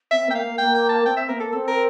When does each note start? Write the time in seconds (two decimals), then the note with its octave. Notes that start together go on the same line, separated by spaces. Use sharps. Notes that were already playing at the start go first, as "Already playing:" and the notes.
0.11 C4 E5
0.27 A#3 G5
0.35 F5
0.43 A#3
0.58 A#3 G5
0.75 G5
0.89 A5
1.05 C4 G5
1.17 E5
1.29 A#3 A#4
1.40 A4
1.52 C4 A4
1.68 A#4